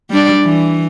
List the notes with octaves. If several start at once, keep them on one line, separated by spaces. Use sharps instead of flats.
G3 D4 D5
E3